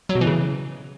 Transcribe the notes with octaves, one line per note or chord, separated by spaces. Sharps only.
F#3
B2
E3
C#3